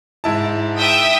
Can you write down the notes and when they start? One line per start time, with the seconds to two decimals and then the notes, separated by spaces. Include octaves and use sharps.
0.24 G#2 E4 A5
0.79 E5 G5 D#6